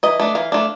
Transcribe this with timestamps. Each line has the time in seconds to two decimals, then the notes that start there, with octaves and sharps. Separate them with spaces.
0.03 E3 D#5
0.20 A3 D4
0.35 E3 F5
0.52 A3 D4